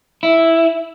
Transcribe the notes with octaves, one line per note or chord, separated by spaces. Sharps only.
E4